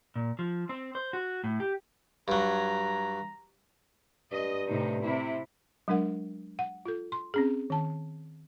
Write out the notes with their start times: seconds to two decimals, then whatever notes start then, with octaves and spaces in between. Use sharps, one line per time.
0.16 A#2
0.39 F3
0.69 C4
0.95 C5
1.13 F#4
1.44 A2
1.60 G4
2.28 G2 F#3 A#5
4.32 G2 D#5
4.68 A2 C3 D#4
5.02 C3 E4
5.88 F#3 G#3 D4 A#4 F#5
6.59 F#5
6.86 F4 A4
7.12 C6
7.34 C4 C#4 G#4
7.70 D#3 A5